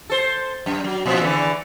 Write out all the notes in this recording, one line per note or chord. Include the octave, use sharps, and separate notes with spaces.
A4 C5
F#2
F#3
A#2 F3 C4
E2 D3 E3